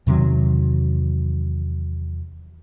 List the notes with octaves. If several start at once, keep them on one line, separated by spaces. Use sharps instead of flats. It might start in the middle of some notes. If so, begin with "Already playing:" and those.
E2 C3 D#3 F#3